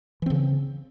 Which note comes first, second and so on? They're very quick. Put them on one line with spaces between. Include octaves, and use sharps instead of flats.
E3 C4 C#3